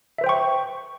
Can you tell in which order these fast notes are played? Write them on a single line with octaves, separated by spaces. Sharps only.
E5 B4 C5 G5 C#6